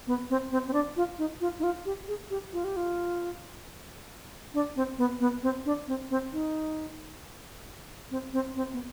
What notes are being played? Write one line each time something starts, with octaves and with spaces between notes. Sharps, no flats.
B3
C4
C4
C4
D4
F4
D#4
F4
D#4
F4
G4
G#4
G4
F4
G4
F4
D4
C4
B3
B3
C4
D4
C4
C4
D#4
C4
C4
C4
B3